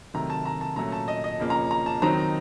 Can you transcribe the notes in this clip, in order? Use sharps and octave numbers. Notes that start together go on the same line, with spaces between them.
C3 D#3 F#3 A3 A#5
A5
A#5
A5
A#2 F#3 A3 C#4 A#5
A5
D#5
D#5
F2 C#3 F3 A#3 C#4
A#5
A#5
A5
D#3 F#3 C4 D#4 A#5